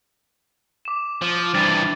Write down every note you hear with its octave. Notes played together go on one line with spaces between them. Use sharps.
D6 E7
F3
G2 E3 A6